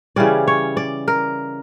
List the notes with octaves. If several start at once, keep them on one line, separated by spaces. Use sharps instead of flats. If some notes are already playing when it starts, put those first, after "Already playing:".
C#3 E3 G3 C#4 D5
C#5
D5
A#4